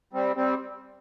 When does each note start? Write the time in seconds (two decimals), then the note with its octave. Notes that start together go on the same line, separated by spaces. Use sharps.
0.13 G3 C4
0.36 G3 C4